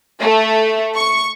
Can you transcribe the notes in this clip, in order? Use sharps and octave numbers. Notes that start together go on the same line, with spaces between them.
A3
C#6